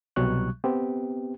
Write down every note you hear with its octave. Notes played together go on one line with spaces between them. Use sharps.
C2 B2 F#3 G3 C#6 F#6
B3 C4 G4